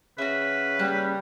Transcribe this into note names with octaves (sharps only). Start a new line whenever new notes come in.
C#3 F#4 B4 E5
G3 A#3 F#6